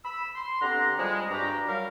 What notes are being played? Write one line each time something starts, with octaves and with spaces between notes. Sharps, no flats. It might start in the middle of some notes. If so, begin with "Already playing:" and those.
B5 E6
C6
D3 B3 C4 G4 F#5 A#5
F3 G3 G#3
G2 F#4 G4 A#5
F#3 G3 A#4 F5